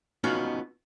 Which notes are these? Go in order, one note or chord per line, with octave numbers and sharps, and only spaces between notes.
B3 C#4 D#4 F4 F#4